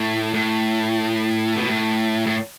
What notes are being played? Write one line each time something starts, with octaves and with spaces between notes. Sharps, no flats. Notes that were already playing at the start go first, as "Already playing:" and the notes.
Already playing: A2
A2
B2
A2
A2